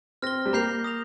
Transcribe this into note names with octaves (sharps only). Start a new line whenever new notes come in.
C4 F6 A#6 G7
G3
A#3 A#5 G6 C7 F7
D#6 A#6 F7